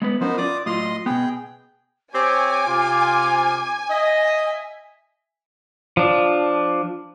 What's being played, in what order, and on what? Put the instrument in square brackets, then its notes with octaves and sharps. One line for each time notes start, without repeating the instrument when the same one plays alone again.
[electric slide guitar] G#3 B3 B4
[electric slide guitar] F3 C#4 A#4 [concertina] B3 D#4 C5
[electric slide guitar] F4 D5 [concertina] D6 D#6
[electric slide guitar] A2 F#3 F4 [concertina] D#5 C6 D#6
[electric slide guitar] B2 B3 [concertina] G#4 G5
[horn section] C4 G4 C#5 [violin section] G#5 [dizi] D6
[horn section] C3 F4
[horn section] D#5 [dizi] E5
[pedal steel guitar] F3 D4